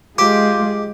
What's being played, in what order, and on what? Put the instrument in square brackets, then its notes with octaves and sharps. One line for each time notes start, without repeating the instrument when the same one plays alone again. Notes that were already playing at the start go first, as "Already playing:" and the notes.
[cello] G#3 [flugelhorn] F4 [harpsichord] G4 C5 [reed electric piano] D6